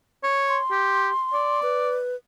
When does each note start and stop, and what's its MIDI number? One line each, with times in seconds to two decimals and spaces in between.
0.23 0.58 73
0.49 1.60 84
0.71 1.09 67
1.33 1.98 74
1.63 2.16 71